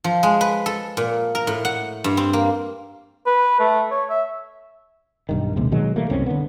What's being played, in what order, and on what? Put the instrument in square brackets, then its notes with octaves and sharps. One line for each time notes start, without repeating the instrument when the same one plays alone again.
[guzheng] F3
G#3
B4
A4
A#2
A#4
A2
F#5
G2
C4
A#3
[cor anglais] B4
A3
C#5
E5
[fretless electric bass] B1 G2 D#3
A#1 D#2 C3 G#3
B2 D#3 F#3 G#3
E3 G3 A3 A#3
F#1 C2 C4 C#4
D3 B3